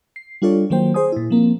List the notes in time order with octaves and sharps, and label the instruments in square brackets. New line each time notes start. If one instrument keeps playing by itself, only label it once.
[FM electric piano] C7
G3 D4 F4 A4 C#5 D5
D#3 F#3 A#3 C5 G5
G#4 C5 G#5 D#6
A#2 E4
F3 A#3 C4